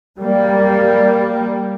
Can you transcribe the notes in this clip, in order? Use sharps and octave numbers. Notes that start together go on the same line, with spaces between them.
G3 A#3